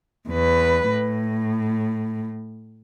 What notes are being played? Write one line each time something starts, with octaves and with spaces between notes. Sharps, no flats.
E2 B4
A2